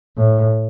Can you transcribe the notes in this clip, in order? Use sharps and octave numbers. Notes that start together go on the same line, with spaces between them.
A2